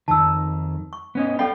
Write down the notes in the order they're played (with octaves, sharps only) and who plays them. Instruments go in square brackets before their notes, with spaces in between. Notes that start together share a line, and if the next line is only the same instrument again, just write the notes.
[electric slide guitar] F2 D#3 [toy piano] A5 E6
[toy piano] C#6
[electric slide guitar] B3 C#4 D#5
[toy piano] C#4 A4 B5 [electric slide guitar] D5 F5 G5